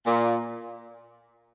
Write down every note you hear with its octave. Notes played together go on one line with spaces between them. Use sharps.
A#2